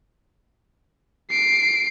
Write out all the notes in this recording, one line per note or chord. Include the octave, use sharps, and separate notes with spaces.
C7 D7